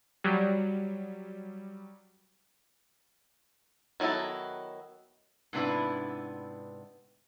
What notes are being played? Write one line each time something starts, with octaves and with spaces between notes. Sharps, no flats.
F#3 G3
D#3 F#3 B3 E4 A4
G#2 C3 B3 D4 E4 B4